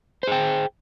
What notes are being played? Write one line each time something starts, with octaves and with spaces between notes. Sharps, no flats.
G#4 C5 G5